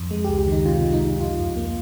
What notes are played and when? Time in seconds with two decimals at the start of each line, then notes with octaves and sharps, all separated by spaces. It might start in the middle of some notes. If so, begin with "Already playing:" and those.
Already playing: F2
0.11 G#3
0.24 C#2 G4
0.38 G4
0.47 D#3 D#4
0.65 C3 F4
0.84 G#3
0.93 D#4
1.02 C#2
1.20 F2 F4
1.39 F2
1.57 A#3